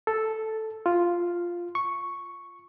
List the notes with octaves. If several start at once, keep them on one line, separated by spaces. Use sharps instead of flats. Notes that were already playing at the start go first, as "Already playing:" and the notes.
A4
F4
C#6